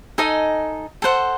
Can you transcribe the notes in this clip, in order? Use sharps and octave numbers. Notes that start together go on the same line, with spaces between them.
D#4 A4 D#5 G#5
A4 C5 F#5